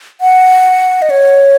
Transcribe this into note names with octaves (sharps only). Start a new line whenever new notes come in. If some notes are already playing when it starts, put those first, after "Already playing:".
F#5
D#5
C#5